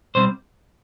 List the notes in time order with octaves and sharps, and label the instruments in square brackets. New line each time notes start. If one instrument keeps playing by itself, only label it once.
[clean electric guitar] B1 B2 G3 C4 C5